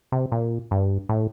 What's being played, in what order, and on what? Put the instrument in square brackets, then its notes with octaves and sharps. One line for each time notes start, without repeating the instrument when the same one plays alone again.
[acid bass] C3
A#2
G2
A2